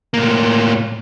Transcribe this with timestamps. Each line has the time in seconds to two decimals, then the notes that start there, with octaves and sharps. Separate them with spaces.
0.14 A2 A#3